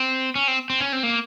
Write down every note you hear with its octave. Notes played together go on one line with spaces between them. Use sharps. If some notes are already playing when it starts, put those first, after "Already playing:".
Already playing: C4
C#4
C4
C4
C#4
C4
A#3